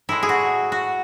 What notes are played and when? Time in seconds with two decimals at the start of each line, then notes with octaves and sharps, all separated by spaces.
0.09 A2 G#3 E4
0.23 G#4
0.29 F#4
0.72 F#4